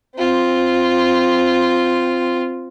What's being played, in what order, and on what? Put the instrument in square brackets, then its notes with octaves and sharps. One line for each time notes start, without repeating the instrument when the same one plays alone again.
[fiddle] C4 F4